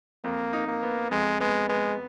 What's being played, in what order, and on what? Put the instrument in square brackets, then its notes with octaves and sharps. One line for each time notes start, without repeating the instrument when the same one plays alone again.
[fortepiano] F2 [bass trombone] A#3
[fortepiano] D#4
[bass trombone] A#3
[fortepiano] B3
[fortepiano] F2 [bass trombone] G#3
[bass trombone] G#3 [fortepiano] B3
[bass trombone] G#3 [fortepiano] B3